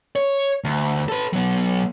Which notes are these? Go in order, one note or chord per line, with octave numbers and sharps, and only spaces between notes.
C#5
D2
A4 B4
F#3 B3